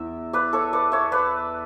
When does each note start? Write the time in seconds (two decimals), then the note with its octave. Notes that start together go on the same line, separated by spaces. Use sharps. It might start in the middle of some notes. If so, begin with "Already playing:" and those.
Already playing: E2 E5
0.33 B4 D5
0.53 A4 C#5
0.73 B4 D5
0.92 C#5 E5
1.12 B4 D5